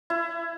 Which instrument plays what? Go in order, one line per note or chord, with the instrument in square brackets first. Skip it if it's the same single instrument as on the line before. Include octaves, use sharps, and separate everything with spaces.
[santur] E4